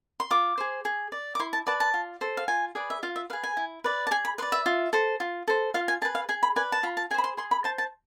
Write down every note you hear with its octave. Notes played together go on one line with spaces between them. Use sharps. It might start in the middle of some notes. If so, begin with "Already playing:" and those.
C6
F4 D6
G#4 C5
G#4
D5
D6
E4 C6
A5
B4 D5 A5
A5
F4
A4 C5
F5
F4 G#5
G#4 B4 D5
E5
F4 F5
E5
G#4 B4 F5
G#5
E4
B4 D5
A5
G#4 G#5
B5
B4 D5 C6
E5
F4
A4 C5
F4
A4 C5
F4 F5
G#5
G#4 B4 A5
F5
G#4 G#5
B5
B4 D5 G#5
A5
F4 B5
A5
G#4 C5 G#5 B5
C6
G#4 C6
B5
C5 A5
A5